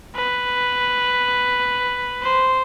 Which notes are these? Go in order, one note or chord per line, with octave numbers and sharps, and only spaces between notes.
B4
C5